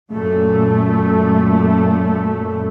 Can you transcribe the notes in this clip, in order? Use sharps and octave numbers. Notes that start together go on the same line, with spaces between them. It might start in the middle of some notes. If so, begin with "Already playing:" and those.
F#2 A#2 A3